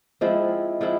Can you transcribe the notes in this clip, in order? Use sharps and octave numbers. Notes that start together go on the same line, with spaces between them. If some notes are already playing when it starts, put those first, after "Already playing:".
F3 G#3 C4 E4
F3 G#3 C4 E4